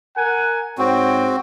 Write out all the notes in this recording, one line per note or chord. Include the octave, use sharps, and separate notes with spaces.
A#4 F#5 G#5
G#2 C4 F#4 C#5 G5